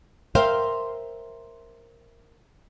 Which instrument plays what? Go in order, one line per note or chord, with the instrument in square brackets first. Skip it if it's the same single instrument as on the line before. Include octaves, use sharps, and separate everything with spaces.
[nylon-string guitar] A#4 C5 E5 F5 G5